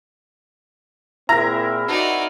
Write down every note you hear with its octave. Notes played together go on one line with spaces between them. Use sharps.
A#2 C4 E4 G#4 A#4 A#5
C4 D#4 F#4 D5